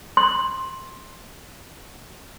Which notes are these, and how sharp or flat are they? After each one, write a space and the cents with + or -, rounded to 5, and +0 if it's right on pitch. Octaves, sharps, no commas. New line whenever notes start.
C6 +15